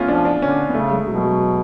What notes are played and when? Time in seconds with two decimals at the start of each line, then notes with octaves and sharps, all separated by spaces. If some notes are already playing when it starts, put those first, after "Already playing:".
Already playing: A3 B3 C#4 F4
0.08 F3 D4
0.25 D4
0.42 D3 C#4
0.69 B3
0.74 C#3 A3
0.91 G#3
1.07 B2 F#3
1.18 G#3
1.24 F#3
1.40 F#3